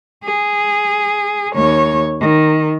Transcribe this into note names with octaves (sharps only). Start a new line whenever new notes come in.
G#4
D#2 C#5
D#3